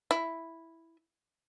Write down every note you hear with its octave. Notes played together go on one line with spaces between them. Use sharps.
E4